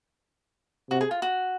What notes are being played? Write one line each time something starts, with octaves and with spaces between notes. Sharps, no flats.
C3 F#4
G#4
F4
F#4